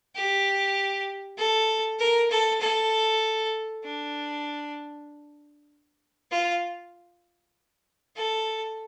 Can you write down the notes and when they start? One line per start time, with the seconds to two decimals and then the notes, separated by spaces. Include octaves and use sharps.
0.15 G4
1.38 A4
1.99 A#4
2.31 A4
2.61 A4
3.85 D4
6.31 F4
8.16 A4